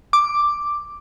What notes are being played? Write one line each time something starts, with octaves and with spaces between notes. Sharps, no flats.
D6